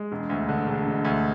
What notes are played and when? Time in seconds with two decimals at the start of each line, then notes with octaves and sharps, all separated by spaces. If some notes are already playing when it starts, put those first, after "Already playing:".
Already playing: G#3
0.12 E1
0.29 D2
0.49 D3
0.67 E1
0.86 E1
1.05 D2